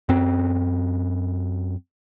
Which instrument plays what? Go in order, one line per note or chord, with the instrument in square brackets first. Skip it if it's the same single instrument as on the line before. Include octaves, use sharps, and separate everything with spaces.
[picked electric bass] F#2 C4